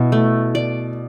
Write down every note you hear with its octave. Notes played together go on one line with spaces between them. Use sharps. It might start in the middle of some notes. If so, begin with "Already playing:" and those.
Already playing: B2 E4
A3
D5